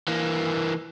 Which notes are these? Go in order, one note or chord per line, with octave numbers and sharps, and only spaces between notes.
E3 A#3